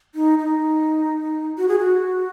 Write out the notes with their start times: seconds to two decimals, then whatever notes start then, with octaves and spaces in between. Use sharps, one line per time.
0.15 D#4
0.39 D#4
1.58 F#4
1.68 G#4
1.79 F#4